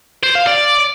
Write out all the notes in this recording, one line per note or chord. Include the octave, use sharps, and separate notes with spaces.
C5
F5
D5